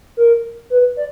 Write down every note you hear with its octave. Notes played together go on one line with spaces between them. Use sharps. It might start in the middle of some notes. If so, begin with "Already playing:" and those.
A#4
B4
D5